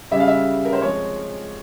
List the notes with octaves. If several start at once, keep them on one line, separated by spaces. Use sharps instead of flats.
C#3 G3 C#4 E5
F5
E5
A#4
C5
F3 G#3 C4 C#5